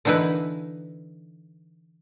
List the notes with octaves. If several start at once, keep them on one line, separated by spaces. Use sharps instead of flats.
D3 E3 D#4 E4 B4